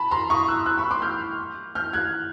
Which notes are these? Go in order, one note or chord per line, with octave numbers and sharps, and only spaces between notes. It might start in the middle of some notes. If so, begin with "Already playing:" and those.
Already playing: A5 B5
A#5 C6
C#6 D#6
E6 F#6
E6 F#6
B5 C#6
C6 D6
F6 G6
F6 G6
F#6 G#6